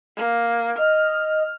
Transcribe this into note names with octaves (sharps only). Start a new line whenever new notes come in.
A#3
D#5 F6